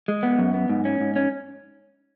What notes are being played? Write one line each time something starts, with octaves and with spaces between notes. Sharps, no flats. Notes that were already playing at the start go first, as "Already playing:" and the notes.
G#3
B3
F#2
B3
G#2
C#4
G#2
C#4